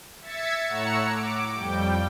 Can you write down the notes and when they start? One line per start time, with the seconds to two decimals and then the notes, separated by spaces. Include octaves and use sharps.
0.22 E5 G#6 A6 B6 C#7
0.68 A2 C#5 F#5 A#5 E6 C#7
1.08 D6
1.54 F2 G3 G5